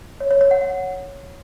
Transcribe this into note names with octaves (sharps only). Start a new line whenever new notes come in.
C#5
C#5
C#5
F#5
F#5